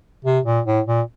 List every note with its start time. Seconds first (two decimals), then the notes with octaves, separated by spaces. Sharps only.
0.25 C3
0.46 A#2
0.66 A2
0.87 A#2